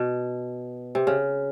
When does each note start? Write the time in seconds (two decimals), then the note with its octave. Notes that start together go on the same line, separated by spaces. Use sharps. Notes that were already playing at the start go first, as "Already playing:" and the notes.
Already playing: B2
0.95 C3
1.07 C#3